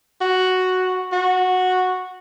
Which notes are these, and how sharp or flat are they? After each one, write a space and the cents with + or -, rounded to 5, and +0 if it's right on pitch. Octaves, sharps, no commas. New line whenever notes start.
F#4 +0
F#4 -10